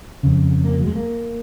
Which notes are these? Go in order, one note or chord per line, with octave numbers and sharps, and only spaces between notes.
F2 C#3
A#3
F#3
G#3
A#3